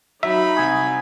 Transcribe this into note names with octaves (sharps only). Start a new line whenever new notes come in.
F#3 D#4 E5 B5
C2 G#5 D#6